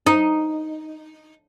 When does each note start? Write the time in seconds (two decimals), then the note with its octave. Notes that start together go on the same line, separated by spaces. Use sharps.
0.07 D#4